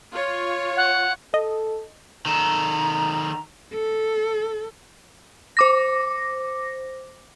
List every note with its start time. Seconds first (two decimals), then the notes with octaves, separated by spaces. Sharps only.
0.12 F4 C#5
0.77 F#5
1.34 A4 D#5
2.26 D#3 A4 A#5
3.74 A4
5.57 C5 D6 A#6